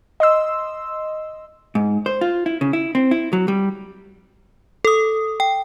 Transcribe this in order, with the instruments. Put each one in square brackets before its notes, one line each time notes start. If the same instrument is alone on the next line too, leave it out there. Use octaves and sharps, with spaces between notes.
[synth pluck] D#5 C6 E6
[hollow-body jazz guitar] G#2
C5
F4
E4
C#3
E4
C4
E4
F#3
G3
[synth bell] A4 D#6
G5